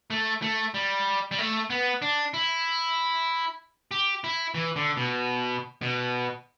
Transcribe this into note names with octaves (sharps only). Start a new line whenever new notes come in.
A3
A3
G3
G3
A3
B3
D4
E4
G4
E4
E3
D3
B2
B2